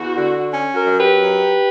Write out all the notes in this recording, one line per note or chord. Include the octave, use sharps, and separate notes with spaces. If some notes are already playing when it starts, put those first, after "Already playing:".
Already playing: E2 F#4
D3
C#4
F#4 A#4
F#2
G4 B4
F#3